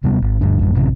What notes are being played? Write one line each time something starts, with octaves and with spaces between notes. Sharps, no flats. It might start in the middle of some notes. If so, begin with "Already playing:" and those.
D1 C3 G3 B3
G#1
G1 D2 G2 D4
D#1 A1 F#2 G3
A1 F#2 C3 D#3